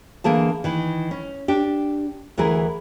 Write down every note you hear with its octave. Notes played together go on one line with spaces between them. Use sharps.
D3 E3 A#3 G#4 A5
D#3 E3
C#4
D4 G4
D2 E3 E4 G#4 A#4